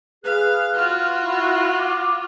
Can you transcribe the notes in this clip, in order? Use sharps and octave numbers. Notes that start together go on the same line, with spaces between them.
G#4 B4 F5 F#6
F4 F#4 F6
E4
D6